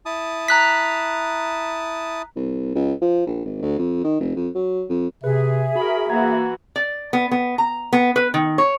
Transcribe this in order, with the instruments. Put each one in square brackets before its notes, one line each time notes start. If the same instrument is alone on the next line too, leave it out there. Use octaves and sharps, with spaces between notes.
[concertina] E4 A5 D#6
[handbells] A#5 F#6 B6
[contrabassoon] C2
C#2
F3
A#1
G#1
D2
F2
D#3
F1
F2
F#3
F2
[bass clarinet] C3 [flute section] G#4 E5 [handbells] B4
[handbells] F#4 [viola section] A#4 B5
[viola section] E3 F#4 [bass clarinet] A#3 [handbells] F#5 A#5 G#6
[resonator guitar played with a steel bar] D5
B3
B3
A#5
B3
B4
D#3
C#5